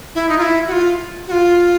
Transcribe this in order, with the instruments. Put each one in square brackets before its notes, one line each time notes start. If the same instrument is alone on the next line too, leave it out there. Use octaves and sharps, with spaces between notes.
[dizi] E4
D#4
F4
E4
F#4
F4
F#4
F4